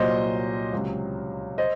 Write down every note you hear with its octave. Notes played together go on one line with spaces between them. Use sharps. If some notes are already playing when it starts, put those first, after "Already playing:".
Already playing: C2 A#2 F#3 C5 D#5
C#2 C3 F#3
C5 D#5